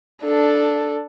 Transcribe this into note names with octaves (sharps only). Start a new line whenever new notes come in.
D4 A4